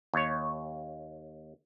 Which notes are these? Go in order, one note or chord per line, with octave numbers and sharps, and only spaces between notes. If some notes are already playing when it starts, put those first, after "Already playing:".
D#2 C#5